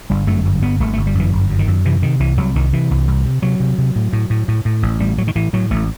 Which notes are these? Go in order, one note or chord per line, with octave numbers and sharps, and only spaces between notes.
G1 G3
F#2 A3
G1
G1 B3
G1 A3
G1 A3
G3
F#2 E3
G1
F#2
D#3
F#2
C3 E3
C3 D#3
C2 E3
C2 F#3
C2 D#3
C3 E3
C2
C2
C3
C3 F#3
C3
C3
A2
A2
A2
A2
A2
A1
A2 G3
A2 F#3
D#3
A2 E3
A2 F#3
A1 A3